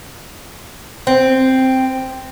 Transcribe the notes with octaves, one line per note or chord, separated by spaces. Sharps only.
C4